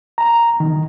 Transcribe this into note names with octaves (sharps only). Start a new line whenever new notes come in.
A#5
D#3